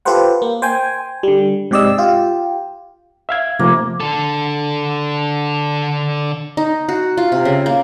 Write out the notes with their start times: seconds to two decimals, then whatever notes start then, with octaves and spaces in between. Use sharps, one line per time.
0.05 F4 G4 A4 B4 C5 F#5
0.42 A#3
0.62 C5 G5 G#5
1.23 D3 G3
1.71 G#2 C3 G4 D5 D#5 E6
1.98 F4 G4
3.29 E5 F5 G#6
3.59 C3 F3 A3 A#3
4.00 D3 A4
6.57 D#4
6.89 F#4
7.17 F4
7.32 C3
7.45 C#3
7.66 A#3